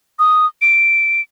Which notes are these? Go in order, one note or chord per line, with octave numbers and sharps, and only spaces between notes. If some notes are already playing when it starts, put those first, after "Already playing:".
D#6
D7